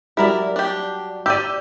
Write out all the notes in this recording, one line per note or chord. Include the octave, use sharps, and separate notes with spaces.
F#3 G3 E4 A#4 D5
D4 G4
G4 D5 E6 G6 D#7